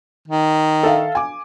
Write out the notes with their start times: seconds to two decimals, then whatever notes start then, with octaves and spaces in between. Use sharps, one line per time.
0.28 D#3
0.83 A4 E5 F5
1.15 G#5 D6